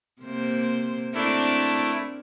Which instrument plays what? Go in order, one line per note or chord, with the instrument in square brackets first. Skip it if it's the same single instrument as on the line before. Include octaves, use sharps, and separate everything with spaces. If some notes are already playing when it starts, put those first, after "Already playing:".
[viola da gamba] C3 A#3 C5
[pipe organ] A3 E4 [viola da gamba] C4 D4 A#4